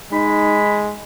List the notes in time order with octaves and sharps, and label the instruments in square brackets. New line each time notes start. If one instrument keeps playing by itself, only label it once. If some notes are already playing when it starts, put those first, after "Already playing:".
[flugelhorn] G#3 [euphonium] D#4 [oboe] B5